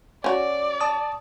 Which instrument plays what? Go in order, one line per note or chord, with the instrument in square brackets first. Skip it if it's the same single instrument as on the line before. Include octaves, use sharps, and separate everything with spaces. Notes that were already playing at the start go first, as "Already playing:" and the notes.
[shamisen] C#4 F#4 [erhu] D5
[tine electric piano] A5 D#6